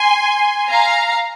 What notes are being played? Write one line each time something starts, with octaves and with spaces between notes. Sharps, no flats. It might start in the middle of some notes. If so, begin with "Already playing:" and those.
Already playing: G#5 C6
F5 A#5